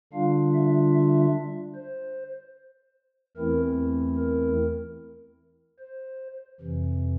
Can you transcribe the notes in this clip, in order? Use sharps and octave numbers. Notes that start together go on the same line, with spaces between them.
D3 G3 D4 F4 F5
E5
E5
C5
E2 E3 A3 C4 E4 A#4
A#4
C5
F2 C3 E3